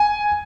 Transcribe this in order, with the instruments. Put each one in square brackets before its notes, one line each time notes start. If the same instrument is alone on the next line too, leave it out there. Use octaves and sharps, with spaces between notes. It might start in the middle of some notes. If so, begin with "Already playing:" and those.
Already playing: [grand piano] G#5